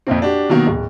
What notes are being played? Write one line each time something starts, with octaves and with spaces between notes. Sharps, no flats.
F2 A#2 A#3 C4
D4 F#4 G4
B2 D#3 F#3 A#3 B3
D1